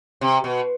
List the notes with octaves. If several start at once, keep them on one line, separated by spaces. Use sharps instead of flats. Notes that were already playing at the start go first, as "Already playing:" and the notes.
C3
B2